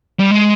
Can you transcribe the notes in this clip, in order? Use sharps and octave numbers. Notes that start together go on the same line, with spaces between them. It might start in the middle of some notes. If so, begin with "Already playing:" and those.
G3
G#3